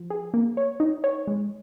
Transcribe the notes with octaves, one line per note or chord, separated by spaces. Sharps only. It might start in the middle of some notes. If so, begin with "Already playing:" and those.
Already playing: F3
G#4
A#3
C#5
D#4
C#5
G#3